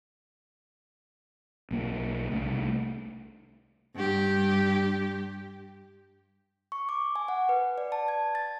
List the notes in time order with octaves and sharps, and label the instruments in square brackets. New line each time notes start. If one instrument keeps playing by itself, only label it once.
[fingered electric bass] B1 A#3
C2 A3
[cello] G2 G4
[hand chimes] C#6
D6
G#5
F#5
B4
D5
A5
G#6
A6